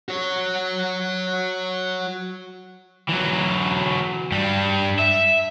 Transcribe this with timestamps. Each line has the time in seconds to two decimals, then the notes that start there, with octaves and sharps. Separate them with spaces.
0.09 F#4 C#5
3.09 E3 F#3
4.32 G2 G3
4.99 E5